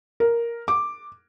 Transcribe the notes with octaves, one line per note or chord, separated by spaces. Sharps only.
A#4
D6